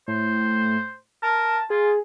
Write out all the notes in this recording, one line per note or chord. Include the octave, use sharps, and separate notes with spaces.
A2 C5
A#4 A5
F4 G#4